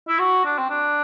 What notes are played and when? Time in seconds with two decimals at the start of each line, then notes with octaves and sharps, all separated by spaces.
0.08 E4
0.19 F#4
0.45 D4
0.58 C4
0.70 D4